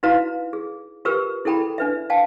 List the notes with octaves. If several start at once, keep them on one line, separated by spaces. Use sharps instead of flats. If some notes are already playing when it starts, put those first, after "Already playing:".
D#4 E4 F#4 B4 F5 A#5
G#4
F4 G4 A#4 B4 E6
E4 G#4 A4 G5 A#5 B5
D4 B4 E5
F5 G5 A5